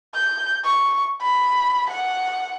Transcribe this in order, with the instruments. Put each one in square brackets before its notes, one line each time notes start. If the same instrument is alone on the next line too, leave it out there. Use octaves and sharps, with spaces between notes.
[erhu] G6
C#6
B5
F#5